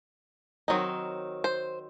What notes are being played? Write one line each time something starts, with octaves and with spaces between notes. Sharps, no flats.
D#3 F#3 C4 D#4
C5